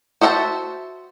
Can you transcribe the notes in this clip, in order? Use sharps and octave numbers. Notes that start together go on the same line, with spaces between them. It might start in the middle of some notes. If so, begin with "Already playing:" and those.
F#4 C5 E5 F#5 A5